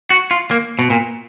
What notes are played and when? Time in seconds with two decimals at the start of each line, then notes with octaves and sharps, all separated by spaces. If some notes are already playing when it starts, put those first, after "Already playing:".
0.10 F#4
0.31 F4
0.51 A#3
0.79 B2
0.90 A#2